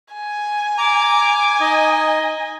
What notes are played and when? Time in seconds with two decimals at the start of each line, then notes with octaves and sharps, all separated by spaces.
0.14 G#5
0.78 A#5 D6
1.60 D#4 D#5